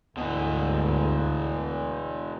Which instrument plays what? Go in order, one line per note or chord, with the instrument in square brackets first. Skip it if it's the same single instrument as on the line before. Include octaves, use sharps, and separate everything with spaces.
[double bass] D2 G#2 [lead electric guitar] B2 E3